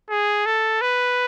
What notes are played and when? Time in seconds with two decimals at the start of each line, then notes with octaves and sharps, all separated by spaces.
0.10 G#4
0.46 A4
0.81 B4